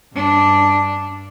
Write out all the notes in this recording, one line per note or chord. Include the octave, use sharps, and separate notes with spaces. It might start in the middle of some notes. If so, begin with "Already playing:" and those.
G2 D4